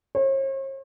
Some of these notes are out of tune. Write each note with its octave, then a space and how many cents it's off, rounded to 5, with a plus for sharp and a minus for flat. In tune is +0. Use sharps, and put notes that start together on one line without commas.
C#5 -45